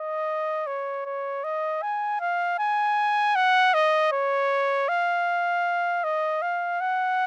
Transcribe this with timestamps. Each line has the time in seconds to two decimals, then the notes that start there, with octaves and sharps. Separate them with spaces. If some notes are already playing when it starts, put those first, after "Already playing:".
Already playing: D#5
0.67 C#5
1.05 C#5
1.44 D#5
1.82 G#5
2.20 F5
2.59 G#5
3.35 F#5
3.74 D#5
4.12 C#5
4.89 F5
6.04 D#5
6.42 F5
6.81 F#5